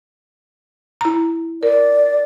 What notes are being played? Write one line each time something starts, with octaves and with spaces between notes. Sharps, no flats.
E4 A#5
A#4 D5